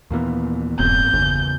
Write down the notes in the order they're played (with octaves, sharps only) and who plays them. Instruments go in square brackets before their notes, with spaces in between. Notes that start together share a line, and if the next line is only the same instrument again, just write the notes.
[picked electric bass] D#2 A#2 E3 [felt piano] A#3 B3
[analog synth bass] E1 [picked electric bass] A1 G2 C4 [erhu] G6
[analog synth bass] G1 [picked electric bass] E2 C#3